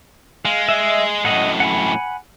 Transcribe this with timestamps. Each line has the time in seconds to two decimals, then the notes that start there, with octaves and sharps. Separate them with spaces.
0.45 G#3 F5
0.69 D#5 E5
1.25 F#2 A2 D#5 F#5
1.60 F#5 G#5 B5